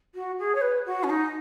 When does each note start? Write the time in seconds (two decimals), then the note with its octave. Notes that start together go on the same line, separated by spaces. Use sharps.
0.14 F#4
0.38 G#4
0.55 C#5
0.61 B4
0.86 F#4
1.03 C#4
1.09 D#4